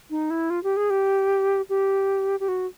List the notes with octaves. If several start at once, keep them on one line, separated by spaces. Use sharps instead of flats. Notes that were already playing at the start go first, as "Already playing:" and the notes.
D#4
E4
F4
G4
G#4
G4
G4
G4
F#4